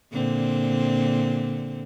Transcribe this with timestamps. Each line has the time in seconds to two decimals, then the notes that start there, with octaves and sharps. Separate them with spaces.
0.13 A#2 D3 C4